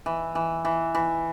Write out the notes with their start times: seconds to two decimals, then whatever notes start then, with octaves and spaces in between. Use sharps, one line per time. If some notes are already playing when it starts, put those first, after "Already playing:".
0.06 E3
0.35 E3
0.65 E3
0.95 E3